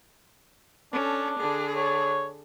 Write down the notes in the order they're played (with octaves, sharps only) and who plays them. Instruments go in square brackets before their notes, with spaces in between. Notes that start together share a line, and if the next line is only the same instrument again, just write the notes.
[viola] C#4 A4 [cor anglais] D4
[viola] D3 G#4
[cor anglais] C#5